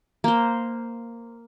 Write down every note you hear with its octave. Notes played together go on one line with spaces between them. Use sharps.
A#3 C5